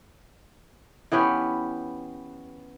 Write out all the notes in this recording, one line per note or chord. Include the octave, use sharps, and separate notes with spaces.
E3 B3 C#4 G4